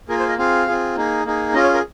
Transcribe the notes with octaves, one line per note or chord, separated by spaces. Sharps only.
A#3 F4 G#4 A#4
C5
D#5
C4 F4 G#4 F5
C4 F4 G#4
A#3 D#4 G#4
A#3 D#4 G#4
C#4 F4 G#4 D#5
C#5
A#4